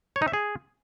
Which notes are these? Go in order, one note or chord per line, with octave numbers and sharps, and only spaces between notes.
C#5
D#4
E5
G#4